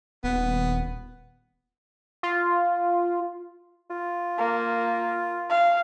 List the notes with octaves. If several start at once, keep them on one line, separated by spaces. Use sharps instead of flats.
D#1 B3
F4
F4
A#3
F5